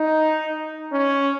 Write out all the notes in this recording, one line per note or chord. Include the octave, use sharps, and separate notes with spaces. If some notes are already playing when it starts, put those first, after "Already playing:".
Already playing: D#4
C#4